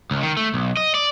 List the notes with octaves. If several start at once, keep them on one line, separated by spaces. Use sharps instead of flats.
C#2
D#3
A3
B1
D#5
D5